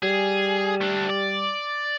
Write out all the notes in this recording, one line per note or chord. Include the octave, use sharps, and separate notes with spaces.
G3 G#4
A3 D4
D5